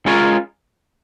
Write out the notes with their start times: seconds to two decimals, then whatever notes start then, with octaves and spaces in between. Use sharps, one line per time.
0.06 G#3 C#4 F4 A#4 C#5